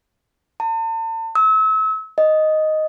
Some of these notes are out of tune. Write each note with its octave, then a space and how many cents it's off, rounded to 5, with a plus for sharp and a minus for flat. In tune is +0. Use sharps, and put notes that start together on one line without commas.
A5 +40
E6 -35
D#5 +0